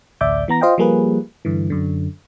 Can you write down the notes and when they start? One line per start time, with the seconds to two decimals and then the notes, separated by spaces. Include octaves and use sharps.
0.21 A1 D2 D5 E5 D6 G6
0.48 E3 B3 A#5 A#6
0.61 F4 C5 D#5 F5 G5
0.78 F3 G3 A#3 G#4 B4
1.45 G2 D3 E3
1.70 F#2 D3